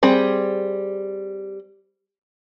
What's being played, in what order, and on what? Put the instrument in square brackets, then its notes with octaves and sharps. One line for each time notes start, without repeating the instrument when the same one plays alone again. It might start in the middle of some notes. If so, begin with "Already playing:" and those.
[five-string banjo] G3 C4 G#4